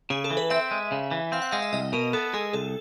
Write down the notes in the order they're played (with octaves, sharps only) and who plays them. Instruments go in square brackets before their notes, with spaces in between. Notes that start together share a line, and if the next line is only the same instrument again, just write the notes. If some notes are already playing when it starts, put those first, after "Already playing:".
[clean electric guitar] C#3 [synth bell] G#4
[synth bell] A4
[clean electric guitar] E3
[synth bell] B4
[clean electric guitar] C4 [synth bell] E5
[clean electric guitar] G#3
C#3
E3
[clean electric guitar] C4 [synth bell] F5
[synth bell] F#5
[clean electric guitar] G#3 [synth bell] F5
[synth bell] E5
[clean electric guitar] C2 [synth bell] D#5
[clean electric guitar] B2 [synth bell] A#4
[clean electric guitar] B3 [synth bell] A4
[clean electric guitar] G#3 [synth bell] G#4
[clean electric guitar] C2 [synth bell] A4